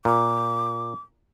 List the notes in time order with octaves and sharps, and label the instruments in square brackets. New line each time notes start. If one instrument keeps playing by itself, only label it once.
[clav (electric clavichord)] A#2 [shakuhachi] D6